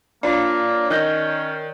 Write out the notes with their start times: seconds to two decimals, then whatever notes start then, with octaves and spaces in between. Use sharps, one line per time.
0.23 A#3 D4 F4 C#5 D5
0.90 D#3 C#4 D#5 F#6 G6